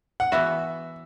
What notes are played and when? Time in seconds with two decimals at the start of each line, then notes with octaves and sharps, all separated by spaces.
0.20 F#5
0.32 E3 B3 F#4 E5